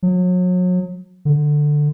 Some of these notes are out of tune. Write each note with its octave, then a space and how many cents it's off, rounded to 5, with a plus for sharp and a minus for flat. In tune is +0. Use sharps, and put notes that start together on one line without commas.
F#3 -35
D3 +10